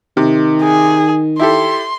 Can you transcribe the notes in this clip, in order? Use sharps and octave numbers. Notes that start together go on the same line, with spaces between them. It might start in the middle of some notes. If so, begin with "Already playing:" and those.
C3 D#3
G#4
E4 G4 A4 C6